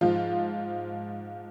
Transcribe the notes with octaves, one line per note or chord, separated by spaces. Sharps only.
G#2 F3 F4